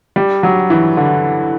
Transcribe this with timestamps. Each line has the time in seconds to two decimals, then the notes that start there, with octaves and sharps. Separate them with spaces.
0.16 G3
0.43 F#3
0.70 E3
0.97 D3